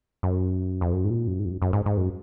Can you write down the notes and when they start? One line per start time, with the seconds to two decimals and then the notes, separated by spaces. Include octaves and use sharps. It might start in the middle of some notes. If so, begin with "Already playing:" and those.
0.23 F#2
0.81 F2
0.93 F#2
1.04 G#2
1.10 A#2
1.27 F#2
1.39 G#2
1.45 F2
1.51 F#2
1.62 F#2
1.73 G#2
1.86 G#2
1.97 F#2